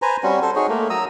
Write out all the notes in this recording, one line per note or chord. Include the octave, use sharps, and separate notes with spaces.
B4 C5 G#5 A#5
G3 C4 C#4 F#4
A4 C5
D#4 F#4 G#4 C#5
A3 A#3
F#3 A#5 D#6 E6